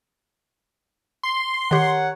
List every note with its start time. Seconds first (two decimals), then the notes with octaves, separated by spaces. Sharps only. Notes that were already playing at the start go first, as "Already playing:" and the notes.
1.23 C6
1.71 D#3 G4 A#4 C#5 F#5